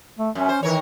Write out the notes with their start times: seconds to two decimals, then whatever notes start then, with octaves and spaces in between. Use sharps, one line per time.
0.19 A3
0.35 F#2 C#4
0.49 C5
0.63 D#3 E3 A#4 C#5